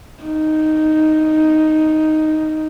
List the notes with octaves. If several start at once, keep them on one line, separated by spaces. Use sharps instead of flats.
D#4